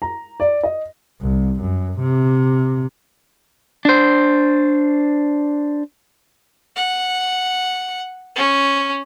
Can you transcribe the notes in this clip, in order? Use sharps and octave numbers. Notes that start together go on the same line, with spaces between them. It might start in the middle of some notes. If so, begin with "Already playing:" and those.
A#5
D5
D#5
C2
F#2
C3
D4 C5
F#5
C#4